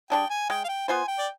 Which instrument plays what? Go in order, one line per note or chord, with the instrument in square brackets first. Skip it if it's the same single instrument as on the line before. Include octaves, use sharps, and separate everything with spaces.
[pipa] G3 D4 G#4 [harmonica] G5
[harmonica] G#5
[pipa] G#3 [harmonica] G5
[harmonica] F5
G5
[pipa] B3 F4 C5 [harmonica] G#5
[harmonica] G5
D5